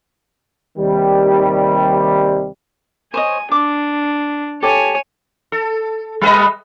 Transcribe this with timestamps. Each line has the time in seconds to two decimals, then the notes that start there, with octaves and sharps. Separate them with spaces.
0.78 D#2 C3 D#3 G3
3.14 C5 C#5 D#5 G#5
3.52 D4 D6
4.63 G4 A4 C#5 G#5 D6
5.52 A4
6.21 G3 B4 D#5